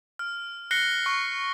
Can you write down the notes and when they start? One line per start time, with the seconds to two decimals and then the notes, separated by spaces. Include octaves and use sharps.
0.19 F6
0.71 F#6 A#6 C7 C#7 G7
1.06 C#6